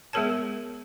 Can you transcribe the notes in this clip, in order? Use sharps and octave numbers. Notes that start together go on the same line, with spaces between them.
G#3 B3 G#4 A#4 C#5 A5